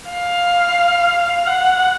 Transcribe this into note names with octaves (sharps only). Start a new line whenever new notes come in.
F5
F#5